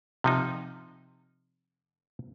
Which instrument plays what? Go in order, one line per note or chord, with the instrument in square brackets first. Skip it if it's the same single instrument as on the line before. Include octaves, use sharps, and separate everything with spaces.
[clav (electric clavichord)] C3 F3 D#4